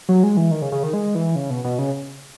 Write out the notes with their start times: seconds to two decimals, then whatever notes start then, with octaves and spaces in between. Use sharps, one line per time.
0.09 F#3
0.23 G#3
0.37 E3
0.51 D#3
0.62 C#3
0.72 C#3
0.83 D#3
0.93 G#3
1.15 E3
1.36 C#3
1.50 B2
1.64 B2
1.79 C#3